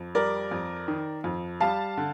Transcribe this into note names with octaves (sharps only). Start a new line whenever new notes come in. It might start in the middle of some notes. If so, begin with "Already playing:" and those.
Already playing: F2
G3 A#4 D5
F2
D#3
F2
G3 F5 A5
D3